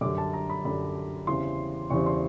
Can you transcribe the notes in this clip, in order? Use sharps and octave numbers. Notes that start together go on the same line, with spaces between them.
F#2 D3 G3 D6
A5
A#5
B5
F#2 D3 G3 B5
E2 C#3 E3 G3 C4 C6
E2 C#3 E3 G3 C4 C#6
C6